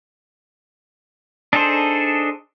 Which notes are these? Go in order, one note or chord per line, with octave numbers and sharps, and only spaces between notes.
D4 D#4 G#4 A4 C5